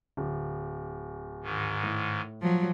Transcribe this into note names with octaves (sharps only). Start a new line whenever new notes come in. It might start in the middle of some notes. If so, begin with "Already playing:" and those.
D1
G#2 D#3
A2
F3 F#3